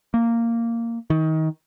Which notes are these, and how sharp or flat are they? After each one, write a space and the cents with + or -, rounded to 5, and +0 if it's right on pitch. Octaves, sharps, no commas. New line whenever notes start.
A#3 -10
D#3 +25